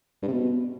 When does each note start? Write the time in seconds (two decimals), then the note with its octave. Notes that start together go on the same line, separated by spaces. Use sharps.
0.22 G2
0.28 C3
0.33 B2